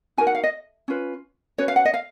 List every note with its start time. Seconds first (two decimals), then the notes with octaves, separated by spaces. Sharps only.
0.17 D#4 F#4 A#4 G#5
0.27 F#5
0.35 F5
0.43 D#5
0.88 C#4 F4 B4
1.58 C#4 F#4 B4 C#5
1.68 F5
1.76 F#5
1.85 D#5
1.94 F5